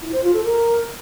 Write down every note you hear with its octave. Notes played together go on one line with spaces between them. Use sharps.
E4
C5
F4
A4
A#4